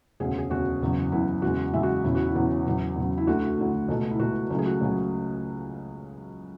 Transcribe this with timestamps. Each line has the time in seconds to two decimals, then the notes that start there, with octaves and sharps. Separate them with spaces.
0.20 E1 D2 C#3 G#4
0.38 G#4
0.50 E1 D2 C#3 F#4
0.82 F#1 E2 C#3
1.12 F#1 E2 C#3 E4
1.42 E2 C#3 G#3 F#4
1.73 E2 C#3 G#3 E5
1.83 F#4
2.04 E1 E2 C#3 E3 E4
2.15 F#4
2.26 E4
2.35 E1 E2 C#3 E3
2.66 E2 C#3 F#3
2.96 E2 C#3 F#3
3.17 E4
3.27 D2 D3 A3 F#4
3.58 D2 D3 A3
3.88 C#2 B2 A3
4.11 E4
4.19 C#2 B2 A3 F#4
4.50 C#2 C#3 F#3 A3
4.59 G#4
4.66 F#4
4.81 C#2 C#3 F#3 A3